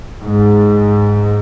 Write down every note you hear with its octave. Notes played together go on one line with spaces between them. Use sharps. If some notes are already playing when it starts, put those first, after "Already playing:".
G#2